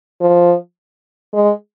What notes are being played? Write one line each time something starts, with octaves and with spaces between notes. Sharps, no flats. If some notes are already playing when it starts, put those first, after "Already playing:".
F3
G#3